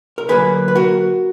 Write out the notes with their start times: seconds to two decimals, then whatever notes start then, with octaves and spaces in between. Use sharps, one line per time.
0.18 A#4
0.29 D3 F#3 A#3 G#4 B4
0.68 B4
0.76 F#4 A#4